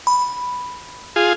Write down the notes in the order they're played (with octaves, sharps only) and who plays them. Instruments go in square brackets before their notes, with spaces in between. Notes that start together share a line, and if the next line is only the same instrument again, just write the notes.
[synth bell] B5
[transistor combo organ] F4 G#4